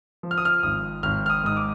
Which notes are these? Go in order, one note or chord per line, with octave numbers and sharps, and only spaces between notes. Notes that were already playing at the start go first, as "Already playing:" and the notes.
F3
F6
D#6
F6
G#1 D#6
G#1 F6
F6
D#6
G#2 D#6
D6